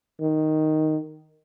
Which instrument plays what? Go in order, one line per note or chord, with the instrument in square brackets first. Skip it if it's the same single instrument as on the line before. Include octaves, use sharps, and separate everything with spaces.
[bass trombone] D#3